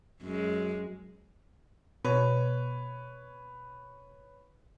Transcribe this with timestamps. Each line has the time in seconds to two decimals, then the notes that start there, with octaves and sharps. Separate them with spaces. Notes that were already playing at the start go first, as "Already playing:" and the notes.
0.22 F#2 G#3
2.05 B2 B4 C#5